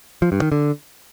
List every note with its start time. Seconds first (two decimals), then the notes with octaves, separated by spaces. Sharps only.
0.22 F3
0.32 G2
0.42 D#3
0.52 D3